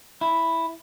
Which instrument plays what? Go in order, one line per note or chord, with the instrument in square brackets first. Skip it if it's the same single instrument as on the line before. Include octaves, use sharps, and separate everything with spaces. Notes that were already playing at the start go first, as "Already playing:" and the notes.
[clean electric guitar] E4